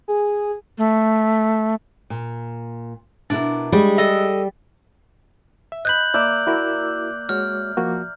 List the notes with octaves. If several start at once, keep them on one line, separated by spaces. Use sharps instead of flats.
G#4
A3
A#2
B2 D4 E4 A#4
G3 G#3
A4 D#5
E5
D#5 B5 F#6 G6 F#7
A#3 D5 E5 G6
E4 F#4 A#4
G#3 F#4 C#5 F6
F3 A#3 F#4